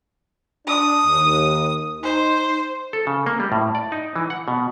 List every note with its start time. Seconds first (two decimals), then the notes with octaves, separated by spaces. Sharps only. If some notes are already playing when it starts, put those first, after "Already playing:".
0.67 D4 D#6
1.06 D#2
2.03 D#4 C5
2.93 A4
3.07 C#3
3.26 A#3
3.40 G3
3.52 A2
3.75 D5
3.92 D#4
4.16 E3
4.30 F#5
4.48 B2